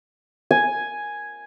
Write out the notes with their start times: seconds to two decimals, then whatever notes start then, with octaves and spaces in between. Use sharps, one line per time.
0.51 G#5